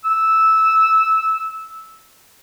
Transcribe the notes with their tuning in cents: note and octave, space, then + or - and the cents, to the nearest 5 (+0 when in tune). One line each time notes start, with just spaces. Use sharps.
E6 -10